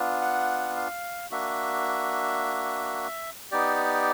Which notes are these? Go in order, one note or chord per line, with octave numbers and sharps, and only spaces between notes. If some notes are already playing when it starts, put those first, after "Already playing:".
Already playing: B3 D4 F4
F#5
F5
A#3 D4 F#4 E5
B3 D#4 G4 D5